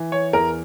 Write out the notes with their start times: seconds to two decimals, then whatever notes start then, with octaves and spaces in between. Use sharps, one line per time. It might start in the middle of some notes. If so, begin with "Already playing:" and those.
Already playing: E3
0.12 C#5
0.33 E2 A#4